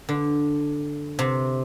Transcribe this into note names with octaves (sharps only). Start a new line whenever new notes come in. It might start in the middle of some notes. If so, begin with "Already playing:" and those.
D3
C3